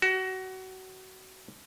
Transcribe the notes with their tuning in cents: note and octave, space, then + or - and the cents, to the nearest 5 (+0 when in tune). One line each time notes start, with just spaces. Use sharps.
F#4 +25